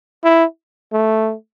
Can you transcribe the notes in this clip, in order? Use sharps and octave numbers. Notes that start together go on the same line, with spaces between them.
E4
A3